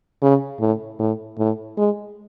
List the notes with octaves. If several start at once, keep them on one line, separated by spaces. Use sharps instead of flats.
C#3
A2
A2
A2
G#3